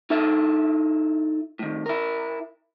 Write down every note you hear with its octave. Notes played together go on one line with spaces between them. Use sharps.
D#4 E4 A4 E5
A2 D#3
E4 A#4